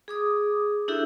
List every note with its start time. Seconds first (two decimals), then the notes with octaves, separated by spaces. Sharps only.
0.08 G#4 D6 D#6
0.88 D4 E4 F#4 G4 A4 E5